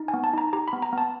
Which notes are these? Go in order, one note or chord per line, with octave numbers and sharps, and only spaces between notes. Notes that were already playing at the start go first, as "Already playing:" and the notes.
Already playing: D#4
G#5
B3
A5
D#4 A#5
G4 A#5
B5
B3
A#5
B3 A5